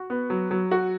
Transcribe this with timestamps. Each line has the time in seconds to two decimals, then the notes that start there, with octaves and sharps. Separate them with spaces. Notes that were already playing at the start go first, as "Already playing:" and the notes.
Already playing: F#4
0.10 B3
0.30 F#3
0.51 F#3
0.71 F#4